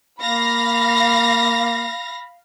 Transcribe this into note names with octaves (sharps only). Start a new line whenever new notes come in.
A#3 F5 B5 A#6